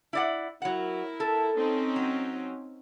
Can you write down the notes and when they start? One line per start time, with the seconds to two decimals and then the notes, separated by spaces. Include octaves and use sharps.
0.13 E4 D5 F#5
0.62 F#3 E4 A#4 F#5
1.20 A4
1.57 C4 C#4 D#4
1.96 F#3